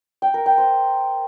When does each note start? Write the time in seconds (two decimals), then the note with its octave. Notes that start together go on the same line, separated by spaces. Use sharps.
0.22 G5
0.34 A#4
0.46 G5
0.58 C5